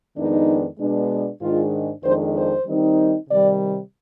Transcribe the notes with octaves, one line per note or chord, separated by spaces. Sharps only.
F2 D#3 G#3 B3 D4 D#4
B2 G#3 B3 D4
G#2 D#3 G#3 D4 F4
F2 D#3 G#3 D4 C5
C5
D#3 G3 C4 D#4
C3 D#3 G3 D5